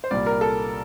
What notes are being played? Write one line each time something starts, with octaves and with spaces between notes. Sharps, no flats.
C5
C2 A#2 G3 D5
A#4
A4